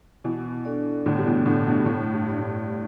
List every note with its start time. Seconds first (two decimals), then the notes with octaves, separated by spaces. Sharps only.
0.24 B2 E3 B3
0.65 D4 A4 D5
1.06 A2 D3 B3
1.18 G3
1.26 B2 E3
1.45 A2 D3 D4 A4 D5
1.66 G2 B2
1.86 A2 A3
2.13 G2
2.26 G4 D5
2.40 G2
2.68 A3